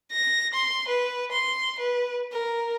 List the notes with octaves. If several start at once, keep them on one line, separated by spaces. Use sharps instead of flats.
A#6
C6
B4
C6
B4
A#4